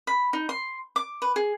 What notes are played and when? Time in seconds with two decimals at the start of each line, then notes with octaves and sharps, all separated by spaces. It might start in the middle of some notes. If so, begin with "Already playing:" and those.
0.07 B5
0.33 D#4
0.49 C6
0.96 D6
1.22 B4
1.36 G#4